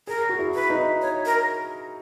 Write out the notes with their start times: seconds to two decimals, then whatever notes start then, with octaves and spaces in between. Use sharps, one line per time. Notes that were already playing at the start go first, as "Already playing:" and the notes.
0.07 G#4 A#4
0.29 F#4
0.39 E4
0.55 B4
0.70 D#4
1.02 C#5
1.25 A#4